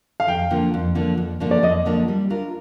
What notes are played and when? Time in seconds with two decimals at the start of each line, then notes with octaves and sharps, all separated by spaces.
0.20 F5
0.28 F2 G5
0.50 D3 F3 A#3 D4
0.74 F2
0.95 D3 F3 A#3 D4
1.17 F2
1.40 D3 F3 A#3 D4
1.51 D5
1.63 F2 D#5
1.85 D3 F3 A#3 D4
2.08 G3
2.30 D4 F4 A#4